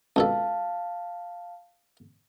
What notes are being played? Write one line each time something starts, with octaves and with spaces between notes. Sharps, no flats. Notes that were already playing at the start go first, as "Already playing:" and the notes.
C#2 B2 A4 F5 A5